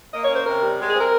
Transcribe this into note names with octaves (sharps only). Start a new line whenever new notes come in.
A#3 D#5
C#5
C#4
C5
C3 A#4
G3
G#3 G4
G#4
C4
A#4